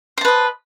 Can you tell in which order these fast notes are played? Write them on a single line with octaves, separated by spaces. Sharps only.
C5 A5 B4 D#5